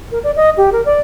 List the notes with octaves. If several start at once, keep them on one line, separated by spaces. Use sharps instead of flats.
A#4
D5
D#5
G4
A#4
D5